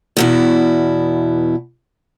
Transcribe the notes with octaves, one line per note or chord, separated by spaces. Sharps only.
E2 B2 E4